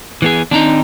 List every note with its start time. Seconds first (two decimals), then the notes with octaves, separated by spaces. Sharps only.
0.22 E3 B3 G#4
0.51 D#3 C4 D4 D#4 A#5